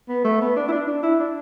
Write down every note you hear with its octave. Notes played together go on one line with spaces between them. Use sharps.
B3
A3
B3
D4
E4
D4
D4
E4
D4